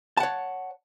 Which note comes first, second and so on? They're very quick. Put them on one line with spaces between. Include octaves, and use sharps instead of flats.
A5 F#5 C#5